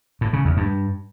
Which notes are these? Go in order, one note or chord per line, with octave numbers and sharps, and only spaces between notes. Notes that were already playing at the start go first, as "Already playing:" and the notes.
A2
C#3
E2
G2